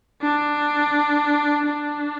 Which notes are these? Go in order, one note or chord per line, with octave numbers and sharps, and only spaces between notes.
D4
D4